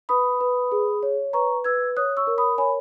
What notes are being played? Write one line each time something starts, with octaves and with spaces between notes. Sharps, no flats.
B4 B5 D#6
B4
G#4
C#5
B4 A#5 C#6
B4 E6 G#6
C#5 D#6 F#6
C#6 E6
A#4
B5 D#6
C#5 G#5 B5